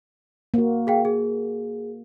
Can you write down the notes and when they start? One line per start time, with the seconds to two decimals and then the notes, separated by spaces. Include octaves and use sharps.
0.54 A#3 F#4
0.87 G#4 F5 G5
1.05 G#4